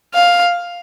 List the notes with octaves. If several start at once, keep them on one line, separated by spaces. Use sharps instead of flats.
F5